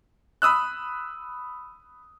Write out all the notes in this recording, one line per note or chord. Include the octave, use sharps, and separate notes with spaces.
B5 D#6 E6 F#6